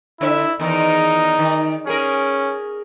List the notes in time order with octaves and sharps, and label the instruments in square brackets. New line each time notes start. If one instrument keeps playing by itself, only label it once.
[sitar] D3 C#5 E5 [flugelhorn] E4
[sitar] E2 D#3 [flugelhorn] D#4
[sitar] D#3
[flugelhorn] C#4 [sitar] G#4 A#4